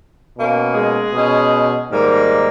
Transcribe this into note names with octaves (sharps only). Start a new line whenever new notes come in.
B2 A#3 C#4
G#3 G#4
B2 G#3 C#4
G#2 D#3 G3 A#3